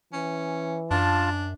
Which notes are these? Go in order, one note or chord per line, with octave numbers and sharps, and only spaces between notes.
E3 C#4
F#2 D4 F4 A5